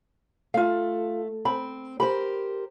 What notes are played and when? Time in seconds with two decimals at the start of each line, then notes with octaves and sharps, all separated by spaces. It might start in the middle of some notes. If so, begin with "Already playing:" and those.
0.54 A3 F4 F5
1.45 C4 B5
2.00 G4 A#4 C5 B5